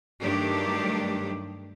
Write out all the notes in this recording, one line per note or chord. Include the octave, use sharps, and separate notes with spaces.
G2 D#3 F#3 A3 D4 G4